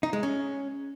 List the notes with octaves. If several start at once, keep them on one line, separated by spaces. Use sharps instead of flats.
D#4
G#3
C#4